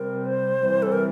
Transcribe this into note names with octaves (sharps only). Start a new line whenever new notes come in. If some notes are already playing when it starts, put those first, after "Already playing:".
Already playing: C3 G3 C4 A#4
C5
C3 E3 G3 C4
A4
A#4